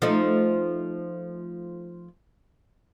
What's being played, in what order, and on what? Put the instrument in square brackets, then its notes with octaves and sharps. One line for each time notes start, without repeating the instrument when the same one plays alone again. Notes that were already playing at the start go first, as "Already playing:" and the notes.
[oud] F3 A3 D#4